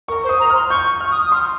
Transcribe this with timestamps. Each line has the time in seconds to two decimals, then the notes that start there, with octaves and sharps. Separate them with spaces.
0.08 A#4 C#6
0.24 C5
0.29 D#6
0.40 A#5
0.50 C6 F6
0.70 C#6 G6
0.91 C#6
1.01 F6
1.11 D#6
1.25 D#6
1.32 C6 F6